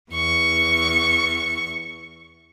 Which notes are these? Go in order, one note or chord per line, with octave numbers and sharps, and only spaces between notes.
E2 C#6